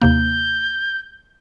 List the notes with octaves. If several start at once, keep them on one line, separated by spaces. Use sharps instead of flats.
D#2 C3 A#3 G6